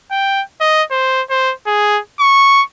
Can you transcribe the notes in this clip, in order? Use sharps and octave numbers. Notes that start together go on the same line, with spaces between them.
G5
D#5
C5
C5
G#4
C#6